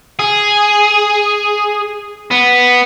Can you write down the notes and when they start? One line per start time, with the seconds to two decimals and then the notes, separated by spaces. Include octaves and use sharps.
0.19 G#4
2.31 B3